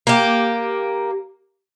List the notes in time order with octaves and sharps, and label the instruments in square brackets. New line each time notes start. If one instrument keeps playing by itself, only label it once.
[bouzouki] A#3 G4